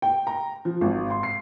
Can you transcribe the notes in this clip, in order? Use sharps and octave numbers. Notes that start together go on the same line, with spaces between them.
G5
A#5
F3
G#1
C6
C7